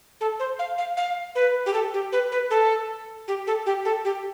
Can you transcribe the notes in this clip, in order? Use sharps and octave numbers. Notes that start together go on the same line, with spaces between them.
A4
C5
F5
F5
F5
B4
G4
A4
G4
B4
B4
A4
G4
A4
G4
A4
G4